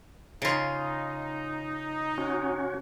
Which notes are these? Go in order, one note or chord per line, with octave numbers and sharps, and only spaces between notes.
C#3 D#4 F4
C#4 F#4